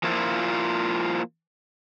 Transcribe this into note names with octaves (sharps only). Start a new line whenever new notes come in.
F3 A#3 E4 F4